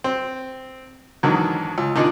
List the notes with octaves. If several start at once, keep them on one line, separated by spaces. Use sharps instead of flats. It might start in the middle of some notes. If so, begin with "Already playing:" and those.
C4
E2 G#2 D3 D#3 F#3
C#2
A#2 D#3 D4 D#4